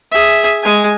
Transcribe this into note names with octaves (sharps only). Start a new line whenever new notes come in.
G#4 E5
G#3 G#5